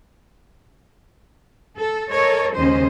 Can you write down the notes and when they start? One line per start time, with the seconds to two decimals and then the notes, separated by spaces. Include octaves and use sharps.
1.77 A4
2.11 A4 A#4 C#5 D#5
2.56 D#2 C#3 G#3 C#4 C5 D#5